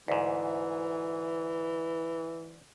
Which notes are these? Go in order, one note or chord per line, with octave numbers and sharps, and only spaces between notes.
D2 G#2 E3